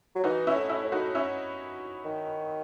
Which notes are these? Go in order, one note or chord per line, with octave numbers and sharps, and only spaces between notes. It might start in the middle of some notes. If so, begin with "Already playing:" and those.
F#3
E3 D#4 F#4
C#4 E4
A2
C#4 E4
A2
D#4 F#4
C#4 E4
D#3